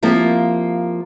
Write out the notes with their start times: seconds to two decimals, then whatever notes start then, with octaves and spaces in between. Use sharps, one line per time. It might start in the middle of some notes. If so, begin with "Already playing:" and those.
0.02 F3 A#3 C4 E4 G4